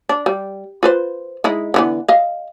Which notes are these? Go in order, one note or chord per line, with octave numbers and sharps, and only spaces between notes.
D4
G3
F4 B4 C5
G#3 D#4 E4
D3 E3 B3
D#5 F5